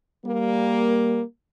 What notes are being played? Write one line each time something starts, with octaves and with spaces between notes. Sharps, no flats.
G3 A#3